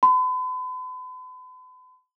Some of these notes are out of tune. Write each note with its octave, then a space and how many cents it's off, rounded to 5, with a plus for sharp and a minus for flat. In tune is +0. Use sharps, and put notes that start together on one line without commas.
B5 +45